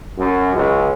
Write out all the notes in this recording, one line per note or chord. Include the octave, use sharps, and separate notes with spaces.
F#2
C#2